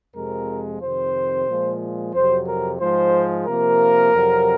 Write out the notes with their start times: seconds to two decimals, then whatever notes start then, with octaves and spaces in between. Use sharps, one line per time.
0.16 F2 C3 F3 G#3 A#4
0.81 F2 C3 D#3 C5
1.48 A#2 F3 G#3
2.14 F2 C3 F#3 C5
2.48 A#4
2.80 G#2 F3 G#3 C5
3.47 C3 F3 A#3 A#4
4.13 F2 C3 F#3